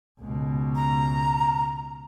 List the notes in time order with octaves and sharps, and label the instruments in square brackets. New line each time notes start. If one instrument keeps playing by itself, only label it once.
[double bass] C#2 B2
[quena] A#5